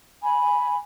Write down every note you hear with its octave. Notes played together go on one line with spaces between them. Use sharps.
G#5 B5